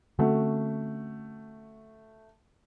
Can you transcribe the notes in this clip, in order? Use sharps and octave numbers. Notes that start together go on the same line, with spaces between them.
D3 A3 C4 C#4 F#4